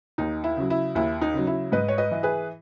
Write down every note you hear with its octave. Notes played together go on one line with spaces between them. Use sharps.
D#2 D#4
E4
C#3 F#3
E4
D#2 E4
D#4
C#3 F#3
E4
G#2 B4 D#5
C#5
B4 D#5
E3
G#4 B4